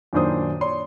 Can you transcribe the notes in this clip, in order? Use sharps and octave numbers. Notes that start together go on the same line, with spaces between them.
F#2 A#2 D#3 D4 C5 D#6
C#5 D5 C6